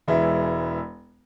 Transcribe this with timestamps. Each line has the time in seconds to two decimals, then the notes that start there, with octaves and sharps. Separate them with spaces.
0.08 E1 E3 G#3 E4